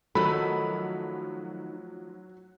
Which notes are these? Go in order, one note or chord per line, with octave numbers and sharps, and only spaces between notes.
D#3 F3 F#3 A3 F#4 A4 B5